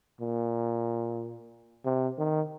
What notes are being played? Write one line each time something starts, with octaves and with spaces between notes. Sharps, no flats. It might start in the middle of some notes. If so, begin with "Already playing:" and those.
A#2
C3
D#3